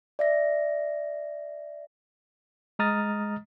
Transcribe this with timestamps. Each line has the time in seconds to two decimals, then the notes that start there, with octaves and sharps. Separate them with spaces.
0.19 D5 E5 A#6
2.79 G#3 D#5 A#5 D#6 F6 A6